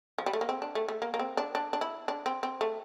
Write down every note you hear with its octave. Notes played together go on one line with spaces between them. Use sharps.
F3
G3
A3
A#3
C4
D4
A3
A3
A#3
A#3
C4
D4
D4
D4
E4
D4
C4
C4
A3